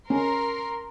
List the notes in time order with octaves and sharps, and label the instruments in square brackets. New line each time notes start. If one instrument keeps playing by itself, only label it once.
[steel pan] C#4 [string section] A#4 C6